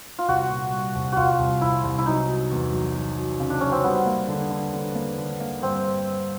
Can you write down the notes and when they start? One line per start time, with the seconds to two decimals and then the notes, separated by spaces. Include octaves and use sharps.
0.19 F4
0.28 C2 F#4
0.50 A#2
0.72 G3
0.95 C2
1.13 C2 F4 F#4
1.39 C2
1.61 C2 E4
1.84 C2
1.98 E4
2.06 F#3 D#4
2.28 F#3
2.51 E2
2.73 F#3
2.95 F#3
3.18 F#3
3.40 C#3
3.50 D4
3.61 F#3 C#4
3.72 C4
3.84 G3 B3
4.06 A#3
4.28 D3
4.50 D3
4.74 D3
4.95 A#3
5.17 D3
5.40 A#3
5.62 G2 C4